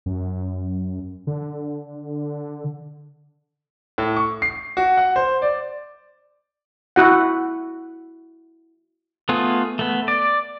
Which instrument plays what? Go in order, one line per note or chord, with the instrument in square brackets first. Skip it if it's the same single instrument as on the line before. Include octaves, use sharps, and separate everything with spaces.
[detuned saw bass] F#2
D3
[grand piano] A2
C#6
C7
F#4
F#5
C5
D5
[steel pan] E4 F#4 F#5
[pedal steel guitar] A3 B3 F4 G#4
A3 B3
D5